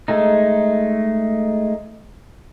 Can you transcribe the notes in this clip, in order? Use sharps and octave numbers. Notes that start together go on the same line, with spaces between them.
G#3 A3 D#4